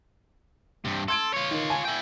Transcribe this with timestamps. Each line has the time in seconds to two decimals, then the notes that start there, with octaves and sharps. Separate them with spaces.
0.85 G2 C3
1.08 A4 C6 G#6 D7
1.34 F4 C#5
1.51 D#3
1.70 G#5
1.85 E4 G5